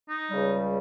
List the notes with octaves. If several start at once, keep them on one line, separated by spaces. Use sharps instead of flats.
D#4
C#2 C#3 G3